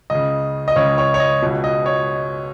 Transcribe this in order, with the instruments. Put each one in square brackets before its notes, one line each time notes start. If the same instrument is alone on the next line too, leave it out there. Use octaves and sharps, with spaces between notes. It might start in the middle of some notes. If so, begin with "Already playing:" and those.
[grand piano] C#2 C#3 D#5
D#5
C#2 C#3 C#5
C#5
C#5
D#5
C#2 B2
D#5
C#5